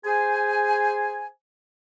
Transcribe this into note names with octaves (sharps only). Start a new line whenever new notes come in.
G#4 C5 G#5